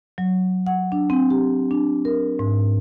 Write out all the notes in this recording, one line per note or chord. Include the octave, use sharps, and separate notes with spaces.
F#3
F#5
D4
C4
G4
D4
A#4
G#2